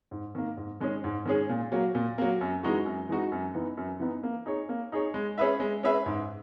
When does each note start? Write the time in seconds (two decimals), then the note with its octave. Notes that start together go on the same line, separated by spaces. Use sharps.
0.11 G#2
0.35 D#3 A#3
0.57 G#2
0.80 D#3 G#3 C#4 G#4
1.04 G#2
1.25 D#3 G#3 C#4 G#4
1.49 A#2
1.72 F#3 A#3
1.95 A#2
2.18 F#3 A#3
2.41 F#2
2.63 E3 G#3 D#4 F#4
2.86 F#2
3.09 E3 G#3 D#4 F#4
3.32 F#2
3.55 E3 B3 D#4
3.77 F#2
4.00 E3 B3 D#4
4.23 A#3
4.46 D#4 G#4 C#5
4.69 A#3
4.92 D#4 G#4 C#5
5.14 G#3
5.38 C#4 G#4 B4 E5
5.60 G#3
5.83 C#4 G#4 B4 E5
6.06 G#2